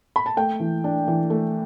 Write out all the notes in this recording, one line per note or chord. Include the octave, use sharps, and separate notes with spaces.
B5
A5
A3 G5
E3
D4
E3
A3